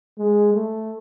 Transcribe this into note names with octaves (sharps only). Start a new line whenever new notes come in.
G#3
A3